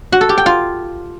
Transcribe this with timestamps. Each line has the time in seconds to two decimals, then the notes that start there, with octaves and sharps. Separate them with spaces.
0.12 F#4
0.21 A4
0.29 G4
0.38 G5
0.46 F4